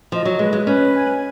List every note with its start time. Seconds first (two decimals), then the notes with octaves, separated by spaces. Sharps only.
0.12 F3 D#5
0.25 F#3
0.39 G#3 B4
0.53 G#3
0.66 C#4 B4
0.93 G#5